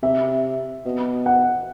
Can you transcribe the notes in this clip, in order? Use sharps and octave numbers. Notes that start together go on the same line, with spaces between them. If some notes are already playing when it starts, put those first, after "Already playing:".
C3 E5
B2
F#5